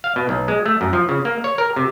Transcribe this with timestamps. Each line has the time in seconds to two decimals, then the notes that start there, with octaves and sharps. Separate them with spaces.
0.04 F5
0.16 B2
0.29 B1
0.48 G#3
0.66 A3
0.81 F#2
0.93 F3
1.09 C#3
1.25 A#3
1.44 C#5
1.58 A#4
1.76 C3